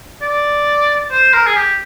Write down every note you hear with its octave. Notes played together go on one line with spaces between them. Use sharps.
D5
C5
A#4
G#4
G4